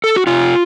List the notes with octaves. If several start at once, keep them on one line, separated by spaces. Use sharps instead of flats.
A4
F#4
C3 F4